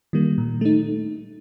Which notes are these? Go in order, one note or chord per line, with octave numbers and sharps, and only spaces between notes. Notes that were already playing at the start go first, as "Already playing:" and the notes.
D#3 G3 A#3
A#2
A3 D#4